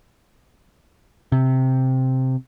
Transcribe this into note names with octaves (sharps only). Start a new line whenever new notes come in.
C3